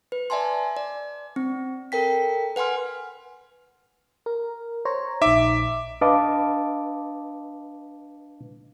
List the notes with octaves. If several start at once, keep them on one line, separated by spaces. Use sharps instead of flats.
B4
D5 E5 G#5 A5 C6
D5
C4
A4 A#4 G5 B6
B4 F#5 G#5 C6 F6
A#4
C5 C#5 A#5
A#1 D#4 E5 D6
D4 B4 D#5 F5 A5 D6